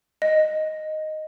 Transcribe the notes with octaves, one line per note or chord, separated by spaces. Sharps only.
D#5